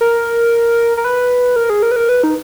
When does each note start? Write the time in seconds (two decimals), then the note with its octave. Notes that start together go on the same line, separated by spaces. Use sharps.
0.01 A#4
0.97 A#4
1.05 B4
1.56 A#4
1.70 G#4
1.83 A#4
1.91 B4
1.96 A#4
2.09 B4
2.24 D#4